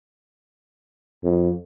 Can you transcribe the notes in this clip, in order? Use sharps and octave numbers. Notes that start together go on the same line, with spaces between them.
F2